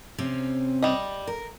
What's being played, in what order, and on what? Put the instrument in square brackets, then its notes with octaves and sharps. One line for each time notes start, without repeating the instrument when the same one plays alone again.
[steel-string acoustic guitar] C3 C4 C#4
[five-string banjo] G3 D#5
[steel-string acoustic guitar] A#4